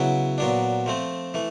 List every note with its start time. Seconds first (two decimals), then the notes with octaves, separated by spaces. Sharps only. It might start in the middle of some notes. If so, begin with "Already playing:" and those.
Already playing: C#3 F#3 B3 E4
0.38 A#2 F#3 B3 D4
0.86 F3 A3 C4
1.34 E3 A3